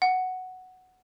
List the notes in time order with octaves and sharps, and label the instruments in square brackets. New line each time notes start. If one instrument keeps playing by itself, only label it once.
[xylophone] F#5